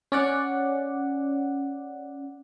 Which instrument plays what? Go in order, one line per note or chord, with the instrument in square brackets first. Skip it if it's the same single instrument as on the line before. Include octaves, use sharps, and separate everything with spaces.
[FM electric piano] C#4 D5 F#5